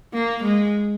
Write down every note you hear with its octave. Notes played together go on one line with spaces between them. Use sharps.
A#3
G#3